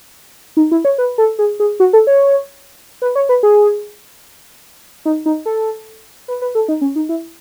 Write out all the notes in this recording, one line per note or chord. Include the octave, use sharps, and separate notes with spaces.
D#4
E4
C#5
B4
A4
G#4
G#4
F#4
A4
C#5
B4
C#5
B4
G#4
D#4
D#4
A4
B4
B4
A4
D#4
C#4
D#4
E4